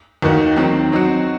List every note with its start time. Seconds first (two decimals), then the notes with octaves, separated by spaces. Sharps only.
0.22 D#2 D#3 A#3 D#4 F#4
0.57 D#3 F#3 C4
0.92 F#3 C4 D#4 F#4